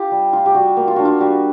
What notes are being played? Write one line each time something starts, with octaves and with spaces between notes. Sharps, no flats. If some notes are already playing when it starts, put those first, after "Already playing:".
Already playing: F4 G4
G3
F4
G4
G3 F#4
A#3
F4
D4 F#4
F4
G3 F#4